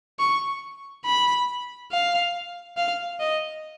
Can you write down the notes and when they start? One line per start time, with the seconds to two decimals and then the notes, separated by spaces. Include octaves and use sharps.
0.19 C#6
1.05 B5
1.92 F5
2.77 F5
3.20 D#5